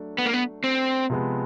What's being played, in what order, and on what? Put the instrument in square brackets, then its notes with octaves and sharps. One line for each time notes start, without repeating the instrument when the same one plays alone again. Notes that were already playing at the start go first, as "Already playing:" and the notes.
Already playing: [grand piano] F#3 A3 D4
[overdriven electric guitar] B3
A#3
B3
C4
[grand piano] C3 F3 G#3 B3